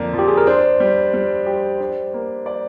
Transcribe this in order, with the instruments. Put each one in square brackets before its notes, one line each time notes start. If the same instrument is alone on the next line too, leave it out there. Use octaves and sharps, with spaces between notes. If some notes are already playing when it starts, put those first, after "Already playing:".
Already playing: [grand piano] F2 D3 A#3 [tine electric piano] D5
[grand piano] F3
[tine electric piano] G4
G#4
A#4
[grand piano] D4 [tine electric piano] C5
[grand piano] G3
G3
G4
D4
A#3
D5